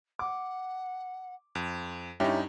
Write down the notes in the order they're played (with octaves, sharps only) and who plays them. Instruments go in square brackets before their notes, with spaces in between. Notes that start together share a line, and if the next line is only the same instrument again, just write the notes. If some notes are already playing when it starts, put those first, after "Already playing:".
[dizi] F#5 [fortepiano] D6
[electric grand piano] F2 [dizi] C6
[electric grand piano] G2 D#4 [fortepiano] C#4 E4 G4 [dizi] A#5